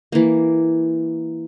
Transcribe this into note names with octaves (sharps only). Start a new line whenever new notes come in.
E3 A#3